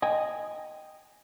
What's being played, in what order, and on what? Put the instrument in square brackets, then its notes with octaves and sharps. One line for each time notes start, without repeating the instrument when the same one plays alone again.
[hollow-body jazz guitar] D#5 G5 G#5